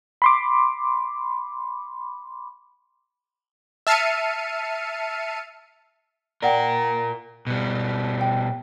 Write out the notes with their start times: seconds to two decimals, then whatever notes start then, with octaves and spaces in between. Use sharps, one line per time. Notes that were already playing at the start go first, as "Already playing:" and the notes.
0.22 B5 C6 D6
3.87 E5 A5 F6 C7 C#7 D#7
6.42 F4 A#4 D5 F#5 G5
7.47 B2 G3
8.21 G5